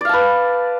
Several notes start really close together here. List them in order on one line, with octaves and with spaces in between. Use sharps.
D5 F5 A5 B4